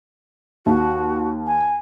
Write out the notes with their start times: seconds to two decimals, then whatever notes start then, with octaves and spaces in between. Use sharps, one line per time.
0.66 D#2 F#4
1.47 G#5